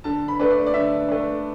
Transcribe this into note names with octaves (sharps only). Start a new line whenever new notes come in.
D3 A5
B5
A3 D4 B4
D5
D5
D3 E5
A3 D4